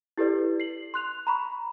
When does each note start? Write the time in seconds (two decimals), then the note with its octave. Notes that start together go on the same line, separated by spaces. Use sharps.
0.18 E4 G4 A4 B4 D5
0.60 C7 F#7
0.94 C6 F#6 F7
1.27 A#5 B5 C#6